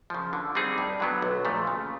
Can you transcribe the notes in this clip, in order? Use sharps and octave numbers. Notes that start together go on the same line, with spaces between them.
C#3 F3
D3
G3 C4 D#4 G#4
G2
D3 F#3 B3
B1
A#2 F3 A3
C#3